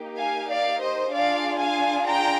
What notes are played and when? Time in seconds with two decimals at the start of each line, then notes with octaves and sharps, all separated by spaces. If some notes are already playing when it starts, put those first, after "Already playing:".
Already playing: A#3 D#4 G4
0.17 F5 G#5
0.49 D5 F5
0.80 C5 D#5
1.12 D4 F4 G#4 D5 F5
1.59 F5 G#5
2.05 G5 A#5